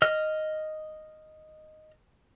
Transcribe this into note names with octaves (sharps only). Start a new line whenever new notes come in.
D#5 F6